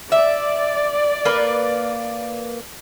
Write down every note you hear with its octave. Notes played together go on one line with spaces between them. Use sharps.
D5 E5
A#3 B4